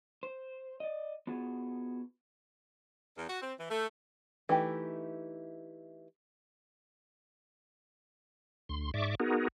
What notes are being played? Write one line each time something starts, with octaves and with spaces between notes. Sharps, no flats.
C5
D5 D#5
B3 F4 F#4 G#4
E2
F#4
C4
E3
A3
E3 A3 D#4 G4
D2 C6
G#2 D5 E5 C#6 D6
B3 D#4 F#4 G#4 A#4